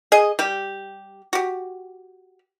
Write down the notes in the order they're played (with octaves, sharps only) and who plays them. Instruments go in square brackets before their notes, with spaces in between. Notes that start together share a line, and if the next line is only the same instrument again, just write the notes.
[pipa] G#4 D#5
G3 G4
F#4 G4